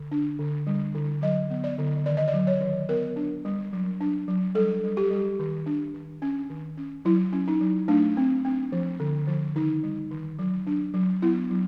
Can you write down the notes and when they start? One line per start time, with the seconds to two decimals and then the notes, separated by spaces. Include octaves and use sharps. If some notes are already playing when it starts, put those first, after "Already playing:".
Already playing: D3
0.11 D4
0.39 D3
0.67 G3
0.95 D3
1.22 F#3 D#5
1.50 B3
1.64 D5
1.78 D3
2.06 D#3 D5
2.17 D#5
2.28 D5
2.34 F#3
2.47 C#5
2.61 D#3
2.89 B3 A#4
3.16 D4
3.45 G3
3.73 F#3
4.01 D4
4.28 F#3
4.55 G3 A4
4.84 G3
4.97 G4
5.11 G3
5.39 D#3
5.66 D4
5.94 D#3
6.22 C#4
6.50 D#3
6.77 C#4
7.05 F#3 E4
7.33 C#4
7.48 D#4
7.61 F#3
7.88 A3 D4
8.17 C4
8.45 C4
8.72 F3
9.00 D3
9.27 F3
9.56 D#3 D#4
9.83 G3
10.11 D#3
10.39 F#3
10.67 D4
10.94 F#3
11.22 B3 E4
11.50 F#3